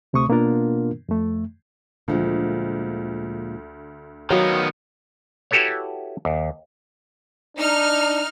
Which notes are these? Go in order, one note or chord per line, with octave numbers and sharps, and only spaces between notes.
D2 C3 A3 C#6 D#6
B2 A#3 B3 D4 F4 A#4
F2 A3
D2 A#2 F3 G#3
D#3 F#3 B3 C#5 F5 G5
E4 F#4 G4 A4 B4 C#5
D#2
D4 D#4 F6